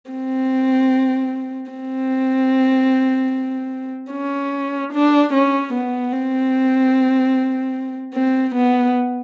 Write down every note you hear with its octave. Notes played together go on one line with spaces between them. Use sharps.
C4
C4
C#4
D4
C#4
B3
C4
C4
B3